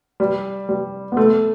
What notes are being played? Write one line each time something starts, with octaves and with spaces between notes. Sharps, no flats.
G3
G3
B3
A3